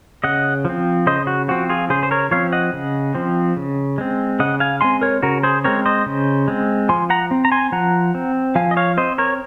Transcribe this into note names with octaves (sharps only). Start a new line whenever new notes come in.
C#3 D#5 F#5
F3 C4
C#3 C5 D#5
F#4
F3 C4 F#4
F4 G#4
C#3 G#4 C5
C5
A#4 C#5
F3 C4 C#5 F5
D#5 F#5
C#3
F3 C4
C#3
G#3 C4
C#3 D#5 F#5
F5 G#5
G#3 C4 G#5 C6
A#4 C#5
C#3 F#4 A#4
G#4 C5
G#3 C4 A#4 C#5
C5 D#5
C#3
G#3 C4
F3 G#5 C6
F#5 A#5
C4
A#5
G#5 C6
F3 F#5 A#5
C4
F3 F5 G#5
D#5
C#5 F5
C4 C5 D#5
A#4 C#5